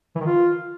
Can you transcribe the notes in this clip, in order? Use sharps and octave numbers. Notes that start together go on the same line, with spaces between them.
E3
D#3
F4